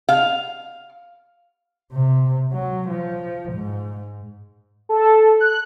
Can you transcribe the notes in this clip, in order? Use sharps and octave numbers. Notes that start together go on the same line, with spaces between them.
F5
C3
F#3
F3
G#2
A4
F#6